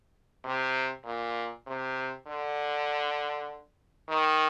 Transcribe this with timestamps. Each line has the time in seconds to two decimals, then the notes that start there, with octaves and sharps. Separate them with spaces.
0.44 C3
1.05 A#2
1.67 C3
2.27 D3
4.09 D#3